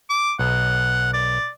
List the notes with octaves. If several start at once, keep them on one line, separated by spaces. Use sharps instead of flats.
D6
B1 F#5
D5